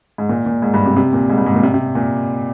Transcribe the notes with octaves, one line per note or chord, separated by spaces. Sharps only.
G#2
A#2
A#2
G#2
G2
C3
C3
A#2
G#2
G2
G#2
A#2
C3
C3
A#2